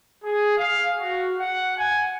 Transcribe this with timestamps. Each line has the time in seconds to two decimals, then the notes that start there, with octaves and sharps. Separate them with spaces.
0.24 G#4
0.57 F5
0.98 F#4
1.40 F#5
1.78 G#5